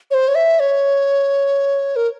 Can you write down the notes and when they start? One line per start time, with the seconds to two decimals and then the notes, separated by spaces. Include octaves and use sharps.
0.11 C#5
0.14 C5
0.28 C#5
0.35 E5
0.60 C#5
1.96 A#4